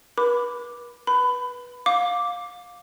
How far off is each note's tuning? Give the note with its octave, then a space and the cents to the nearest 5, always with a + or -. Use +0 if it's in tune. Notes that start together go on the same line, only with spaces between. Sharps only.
B4 -40 B5 +10 D6 +0
B4 -15 B5 +25
F5 +20 D6 -5